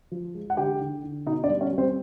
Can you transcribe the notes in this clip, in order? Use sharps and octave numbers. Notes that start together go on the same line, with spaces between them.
F3
G#3
F#5
D3 G4 G5
D3
D3
B2 D#4 D#5
D4 D5
G3
C#4 C#5
G3
C4 C5